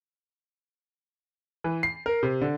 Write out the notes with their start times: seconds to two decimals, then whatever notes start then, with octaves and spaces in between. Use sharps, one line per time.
1.64 E3
1.83 C7
2.06 A#4
2.23 C3
2.41 D3